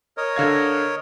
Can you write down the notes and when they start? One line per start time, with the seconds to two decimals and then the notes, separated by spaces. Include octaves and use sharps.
0.17 A#4 C#5 D#5
0.36 D3 F5 G#6